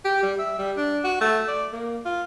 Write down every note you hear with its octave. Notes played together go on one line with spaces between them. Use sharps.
G4
G3
E5
G3
D4
F#4
A3
D5
A#3
F4